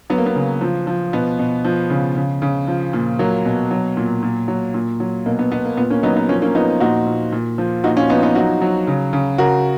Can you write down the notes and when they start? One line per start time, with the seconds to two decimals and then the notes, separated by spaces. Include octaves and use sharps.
0.10 F#3 B3
0.18 A#3
0.26 B3
0.35 C#3
0.61 F3
0.87 F3
1.13 B2 B3
1.39 B2
1.65 F3
1.90 C#3
2.16 C#3
2.42 C#3
2.68 F3
2.93 A#2
3.19 F#3 A#3
3.45 B2
3.71 F#3
3.97 A#2
4.23 A#2
4.48 F#3
4.74 A#2
5.00 F#3
5.26 B2 A#3
5.39 B3
5.51 B2 B3
5.65 A#3
5.77 A#2 B3
5.90 A#3 C#4
6.03 F#3 B3 D#4
6.16 B3 D#4
6.29 F3 A#3 C#4
6.42 A#3 C#4
6.55 F3 B3 D#4
6.80 A#2 D#4 F#4
7.06 A#2
7.32 A#2
7.58 F3
7.84 A#2 D#4 F#4
7.97 C#4 F4
8.09 F3 B3 D#4
8.23 B3 D#4
8.35 F#3 D#4 F#4
8.62 F#3
8.87 C#3
9.13 C#3
9.38 C#3 F#4 A#4